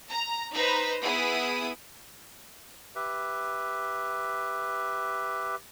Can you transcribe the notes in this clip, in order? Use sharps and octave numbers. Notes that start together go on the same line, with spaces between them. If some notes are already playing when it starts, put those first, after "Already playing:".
A#5
D#4 B4 C5 A#5 B5
B3 E4 G#4 D#6
G4 B4 E5